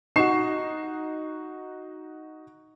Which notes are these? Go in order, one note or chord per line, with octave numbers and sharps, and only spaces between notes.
D#4 F#4 C#6 C7 E7